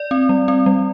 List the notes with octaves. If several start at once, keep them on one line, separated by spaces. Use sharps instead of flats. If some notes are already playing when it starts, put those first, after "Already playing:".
Already playing: D5
C4
G3
C4
G3